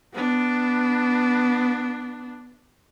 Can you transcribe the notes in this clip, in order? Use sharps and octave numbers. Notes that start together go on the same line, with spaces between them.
B3 D4